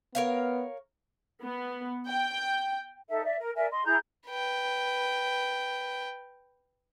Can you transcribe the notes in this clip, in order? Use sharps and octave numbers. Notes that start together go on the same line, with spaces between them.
B3 A#4 C#5 F5
B3
G5
D#4 A4 E5
D5 E5
A#4
A#4 D5 E5 G#5
D#5 C6
E4 G#4 A#5 G6
B4 G5